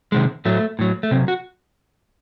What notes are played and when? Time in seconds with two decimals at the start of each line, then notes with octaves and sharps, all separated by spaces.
0.12 C3 D#3 G#3
0.45 A2 F#3 A3
0.79 A2 F#3
1.03 A3
1.11 C3 F#3 C4
1.28 F#4